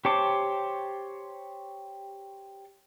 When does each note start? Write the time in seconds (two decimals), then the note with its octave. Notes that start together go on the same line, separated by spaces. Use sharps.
0.05 G4 C5 C#5 A5 D6